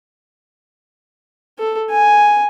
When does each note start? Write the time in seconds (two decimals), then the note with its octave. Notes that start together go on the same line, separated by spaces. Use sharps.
1.59 A4
1.90 G#5